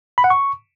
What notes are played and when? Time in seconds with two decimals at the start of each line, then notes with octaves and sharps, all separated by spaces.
0.18 B5
0.24 F#5
0.30 C#6